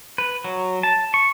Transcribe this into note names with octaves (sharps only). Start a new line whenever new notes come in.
B4
F#3
A5
C#6